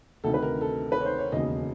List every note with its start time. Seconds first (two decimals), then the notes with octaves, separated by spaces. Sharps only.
0.24 D2 C3 D#3 A4
0.34 B4
0.43 A#4
0.61 A4
0.92 B4
1.00 C#5
1.05 C5
1.19 C#5
1.32 E1 D#2 C#3 D#5